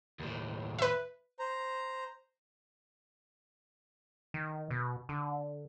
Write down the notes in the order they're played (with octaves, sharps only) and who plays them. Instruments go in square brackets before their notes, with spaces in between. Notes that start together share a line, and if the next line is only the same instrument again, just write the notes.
[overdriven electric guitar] D#2 A2
[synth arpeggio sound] B4 E5
[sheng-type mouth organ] C5 A#5
[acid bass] D#3
B2
D3